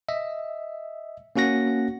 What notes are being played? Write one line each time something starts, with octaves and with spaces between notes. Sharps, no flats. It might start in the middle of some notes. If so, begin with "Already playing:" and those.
D#5 E5
A#3 C#4 F#4 F#5 A#6